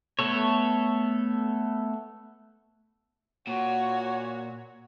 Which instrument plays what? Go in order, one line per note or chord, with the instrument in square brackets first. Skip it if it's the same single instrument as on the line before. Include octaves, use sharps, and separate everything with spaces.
[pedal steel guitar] A3 B3 A4 C#5
[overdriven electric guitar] A#2 [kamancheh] F#4 C#5